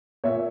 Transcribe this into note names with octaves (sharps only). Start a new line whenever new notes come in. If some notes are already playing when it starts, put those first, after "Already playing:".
A#2 C#5 E5